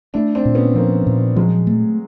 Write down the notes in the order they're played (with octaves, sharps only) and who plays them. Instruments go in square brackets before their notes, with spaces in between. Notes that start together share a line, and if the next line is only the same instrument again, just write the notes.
[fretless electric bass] A3 [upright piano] D4 E4
[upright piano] C4 D4
[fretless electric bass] A#2
[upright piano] B3 C#4
[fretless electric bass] F3 [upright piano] A#3 C4
[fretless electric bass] A#2
[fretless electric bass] F3 [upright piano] F#3 G#3
[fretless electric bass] A3